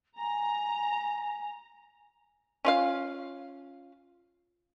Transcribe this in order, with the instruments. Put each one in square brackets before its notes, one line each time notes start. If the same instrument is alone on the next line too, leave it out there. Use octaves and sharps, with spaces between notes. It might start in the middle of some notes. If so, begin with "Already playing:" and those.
[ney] G#5 [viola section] A#5
[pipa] C#4 F4 F5